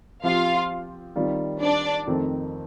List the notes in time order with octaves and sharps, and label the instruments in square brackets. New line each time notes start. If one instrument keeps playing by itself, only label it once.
[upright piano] F3 C4 G4 [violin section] F4 F5
[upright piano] D#3 G3 C4 F4
[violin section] D4 D5
[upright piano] F2 D#3 A3 C4